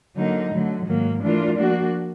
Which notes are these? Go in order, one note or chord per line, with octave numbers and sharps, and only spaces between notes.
D3 F#3 A#3 D#4
D3 F#3 A3
G#2 D#3 F#3 A#3
E3 A3 D4 F4 A#4
F3 A#3 D4 F#4